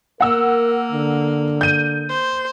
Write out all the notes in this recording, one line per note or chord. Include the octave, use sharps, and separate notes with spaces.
A#3 A#4 F#5 E6
D3
G6 D#7
C5